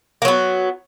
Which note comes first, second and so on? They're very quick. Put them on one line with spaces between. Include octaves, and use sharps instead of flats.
A#3 F#3 B3